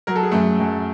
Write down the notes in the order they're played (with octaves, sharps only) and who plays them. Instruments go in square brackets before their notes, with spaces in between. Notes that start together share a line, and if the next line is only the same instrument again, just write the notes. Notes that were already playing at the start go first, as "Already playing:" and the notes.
[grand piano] F#3 A#4
A4
G#4
F#2 A3 A4
F#2